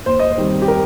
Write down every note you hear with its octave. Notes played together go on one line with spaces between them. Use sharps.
D#2 C5
D#5
C5
D#3 G3 C4
G4
A#4